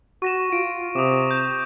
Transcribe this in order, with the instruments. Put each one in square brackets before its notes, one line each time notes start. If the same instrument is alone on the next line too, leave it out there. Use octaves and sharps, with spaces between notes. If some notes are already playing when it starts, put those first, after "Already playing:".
[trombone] F#4 [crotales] C#6 A#6 E7
[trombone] F4 [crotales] D7
[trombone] C3 [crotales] D6 D#6
[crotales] G6 E7